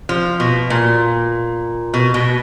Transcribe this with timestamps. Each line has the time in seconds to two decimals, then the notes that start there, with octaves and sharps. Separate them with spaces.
0.09 F3
0.40 B2
0.70 A#2
1.94 B2
2.14 B2